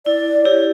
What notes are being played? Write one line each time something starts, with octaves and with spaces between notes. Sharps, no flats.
E4 D5
E4 G4 C#5